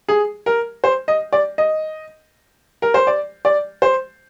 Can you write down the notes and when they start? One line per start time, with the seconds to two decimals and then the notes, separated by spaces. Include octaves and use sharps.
0.09 G#4
0.46 A#4
0.84 C5
1.08 D#5
1.33 D5
1.58 D#5
2.82 A#4
2.94 C5
3.07 D5
3.45 D5
3.82 C5